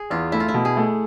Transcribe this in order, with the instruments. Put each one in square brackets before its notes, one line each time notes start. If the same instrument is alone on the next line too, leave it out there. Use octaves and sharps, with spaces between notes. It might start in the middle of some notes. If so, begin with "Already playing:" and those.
Already playing: [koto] G#4
[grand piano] E2 [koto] F4
[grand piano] A3 [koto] E4
[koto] F4
E4
[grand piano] B2
[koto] G#4
[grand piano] A3